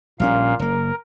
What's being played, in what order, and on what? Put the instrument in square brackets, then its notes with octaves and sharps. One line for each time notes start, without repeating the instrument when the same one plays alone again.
[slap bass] A#1 G3 C#4 [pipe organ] A#2 F5
[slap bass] F#1 A#3 [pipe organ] A#4